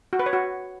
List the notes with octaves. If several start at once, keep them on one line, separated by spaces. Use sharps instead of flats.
F#4
B4
C#5
F#4